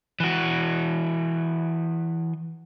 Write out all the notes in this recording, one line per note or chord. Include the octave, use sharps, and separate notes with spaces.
E3 F#4